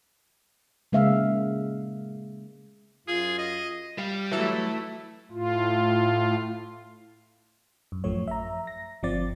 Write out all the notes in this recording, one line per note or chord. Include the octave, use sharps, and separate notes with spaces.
C#3 G#3 A#3 E5 F5
F#2 F4 G#4
D#5
G3 F5
E3 F#3 A3 E4 A4
A2 F4
F#2
A1 F#2 F3 A3 C#5
E5 A#5
A#6
G1 F3 C4 D5 A6